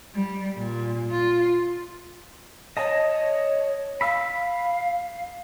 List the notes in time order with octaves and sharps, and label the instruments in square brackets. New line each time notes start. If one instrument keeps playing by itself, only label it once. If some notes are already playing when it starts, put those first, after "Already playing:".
[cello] G3
A#2
F4
[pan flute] C#5 [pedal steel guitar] D#5 A5
[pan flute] F5 [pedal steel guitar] B5 E6